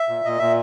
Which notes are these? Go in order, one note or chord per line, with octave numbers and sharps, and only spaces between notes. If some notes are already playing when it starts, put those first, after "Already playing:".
Already playing: E5
A#2
A#2 D#5
A#2 E5